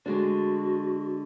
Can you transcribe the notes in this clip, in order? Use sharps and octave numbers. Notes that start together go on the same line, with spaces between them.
D3 G#3 D4 F#4